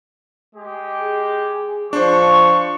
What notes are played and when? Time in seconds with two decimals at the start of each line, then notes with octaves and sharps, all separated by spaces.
0.55 G#3 G4
1.00 G#4
1.93 F3 D4 C5 C#6